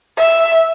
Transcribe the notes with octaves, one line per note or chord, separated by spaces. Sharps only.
E5